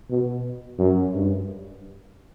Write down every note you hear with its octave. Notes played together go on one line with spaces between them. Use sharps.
B2
F#2
G2